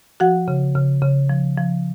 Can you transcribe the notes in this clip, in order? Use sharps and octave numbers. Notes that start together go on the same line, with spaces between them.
F3 F#4 F#5
C#3
C#3
C#3
F3
F3